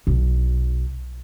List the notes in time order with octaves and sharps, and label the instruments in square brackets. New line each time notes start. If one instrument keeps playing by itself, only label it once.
[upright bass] B1